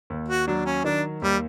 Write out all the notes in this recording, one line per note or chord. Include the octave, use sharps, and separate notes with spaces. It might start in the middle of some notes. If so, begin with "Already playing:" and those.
D#2
F#4
F#3 D4
C#4
D#3 D4
D#2 G3